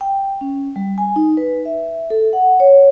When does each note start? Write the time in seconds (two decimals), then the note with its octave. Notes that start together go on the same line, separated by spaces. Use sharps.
0.01 G5
0.41 C#4
0.76 G3
0.98 G#5
1.16 D#4
1.37 B4
1.65 E5
2.10 A4
2.33 F#5
2.60 C#5